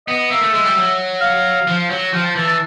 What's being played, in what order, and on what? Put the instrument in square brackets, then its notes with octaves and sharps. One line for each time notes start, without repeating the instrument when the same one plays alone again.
[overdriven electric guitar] B3 [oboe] D#5
[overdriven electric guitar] A#3 [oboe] E5
[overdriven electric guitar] A3
G#3
G3
F#3
[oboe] F5
[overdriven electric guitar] F3
F#3
[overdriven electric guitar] F3 [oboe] G5
[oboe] A5
[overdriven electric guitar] E3 [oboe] A5
[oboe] A5